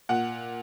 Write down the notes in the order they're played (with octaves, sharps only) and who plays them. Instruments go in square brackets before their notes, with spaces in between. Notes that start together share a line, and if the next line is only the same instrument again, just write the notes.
[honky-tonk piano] A#2 F#5